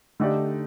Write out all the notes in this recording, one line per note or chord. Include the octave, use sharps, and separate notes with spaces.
D3 A3 D#4 G4 D5